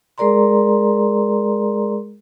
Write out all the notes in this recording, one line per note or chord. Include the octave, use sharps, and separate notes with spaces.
G#3 G#4 A#4 D5 A#5 C6